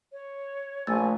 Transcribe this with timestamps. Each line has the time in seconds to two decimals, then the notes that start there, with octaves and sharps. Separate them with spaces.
0.13 C#5
0.87 A#1 A3 G#5 E6 A6